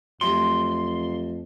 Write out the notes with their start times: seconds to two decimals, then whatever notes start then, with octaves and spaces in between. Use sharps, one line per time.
0.21 F2 F#3 A3 G4 C6